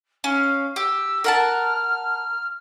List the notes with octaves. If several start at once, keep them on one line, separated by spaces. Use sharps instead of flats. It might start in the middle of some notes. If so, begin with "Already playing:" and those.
C#4 F5
G4 E6
A#4 F#5 A5 F6